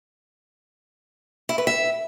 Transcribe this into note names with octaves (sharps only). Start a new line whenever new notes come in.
E4
B4
E5